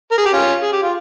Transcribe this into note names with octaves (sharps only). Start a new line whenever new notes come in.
A#4
G#4
G4
C#4 F4
G#4
G4
F4